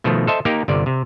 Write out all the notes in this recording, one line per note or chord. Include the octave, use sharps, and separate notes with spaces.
B2 D#3 F3 A3
A4 C5 D#5 E5 A5
A#3 D#4 G4 A#4
G1 C3 D5
C3